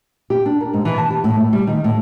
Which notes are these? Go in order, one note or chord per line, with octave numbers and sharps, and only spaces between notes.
G4
D4
A#4
G#2
E3
A5
G4
A2
A3
G3
D#3
A2